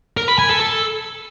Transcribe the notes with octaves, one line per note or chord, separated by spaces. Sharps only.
A#4
B5
G#5
A4
A4